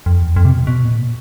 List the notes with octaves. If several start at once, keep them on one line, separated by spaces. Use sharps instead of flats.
F2
E2
F2
C3
B2
B2
A#2